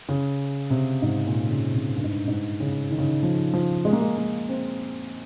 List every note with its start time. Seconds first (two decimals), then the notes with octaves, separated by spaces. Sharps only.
0.09 C#3
0.70 C3
1.02 G#2
1.27 A#2
1.49 C#3
1.74 C3
1.96 G2
2.04 G#2
2.12 G2
2.28 G#2
2.60 C#3
2.91 D#3
2.98 C#3
3.08 D#3
3.23 F3
3.53 F3
3.85 G#3
3.93 A#3
4.01 G#3
4.17 A#3
4.49 C4